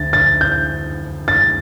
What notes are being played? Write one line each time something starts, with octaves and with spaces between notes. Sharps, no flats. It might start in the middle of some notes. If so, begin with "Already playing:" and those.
Already playing: D2 A6
A6
G6
A6